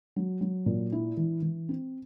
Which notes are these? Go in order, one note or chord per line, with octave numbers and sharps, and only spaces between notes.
F#3
F#3
A#2
E4
E3
E3
C4